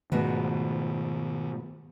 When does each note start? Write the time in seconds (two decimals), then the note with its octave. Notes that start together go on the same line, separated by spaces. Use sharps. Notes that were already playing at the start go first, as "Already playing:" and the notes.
0.12 G#2 B2 D#3 F3 A3